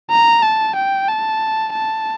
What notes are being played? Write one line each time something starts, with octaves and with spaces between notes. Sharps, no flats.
A#5
A5
G5
A5
A5